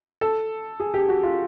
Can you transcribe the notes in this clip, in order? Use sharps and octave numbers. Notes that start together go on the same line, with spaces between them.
A4
G#4
G4
F#4
F4